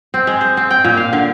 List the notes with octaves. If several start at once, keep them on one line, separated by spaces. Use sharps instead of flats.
C4
G#3
C5
C4
G5
A#2
F5
D3